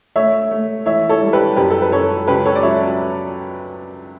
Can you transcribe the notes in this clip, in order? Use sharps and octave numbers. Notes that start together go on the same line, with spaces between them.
A3 C#5 E5
A3
E3 C#5 E5
A4 C#5
G3
G4 B4
F#2 G4 B4
A4
B4
F#2 A4 C#5
C#2 G4 B4
A4 C#5
D5
F#3 C#5 E5